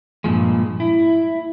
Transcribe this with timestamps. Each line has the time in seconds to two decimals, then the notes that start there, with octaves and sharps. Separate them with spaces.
0.24 G2 A#2 F3 G#3
0.80 E4